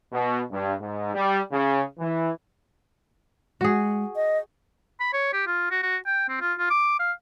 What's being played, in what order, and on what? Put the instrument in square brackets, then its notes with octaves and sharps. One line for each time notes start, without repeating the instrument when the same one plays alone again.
[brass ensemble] B2
G2
G#2
G3
C#3
E3
[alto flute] G#3 [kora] F#4 G#4
[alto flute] D#5
[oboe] B5
C#5
G4
F4
F#4
F#4
G5
C4
F4
F4
D6
F5